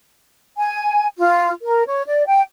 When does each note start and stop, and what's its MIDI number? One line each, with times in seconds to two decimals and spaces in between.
0.57 1.07 80
1.17 1.52 65
1.62 1.83 70
1.87 2.06 73
2.06 2.27 74
2.27 2.41 79